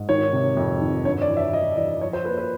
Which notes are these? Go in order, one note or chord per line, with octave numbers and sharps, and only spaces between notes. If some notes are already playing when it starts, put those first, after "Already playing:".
Already playing: G#2
D#3 C#5
C3
F2
D#3
G2 C#5
D5
E3
E5
E3 D#5
E3 D5
F3 C#5
C5
A#3 B4
B4